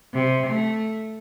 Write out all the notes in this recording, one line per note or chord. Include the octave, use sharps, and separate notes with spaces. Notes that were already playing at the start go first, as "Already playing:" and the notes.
C3
A3